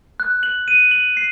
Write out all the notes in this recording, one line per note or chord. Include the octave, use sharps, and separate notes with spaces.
F#6
F#7
D#7
F#7
C7